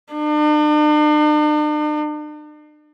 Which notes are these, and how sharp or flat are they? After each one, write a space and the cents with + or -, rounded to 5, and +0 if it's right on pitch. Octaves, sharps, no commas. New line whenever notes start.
D4 +45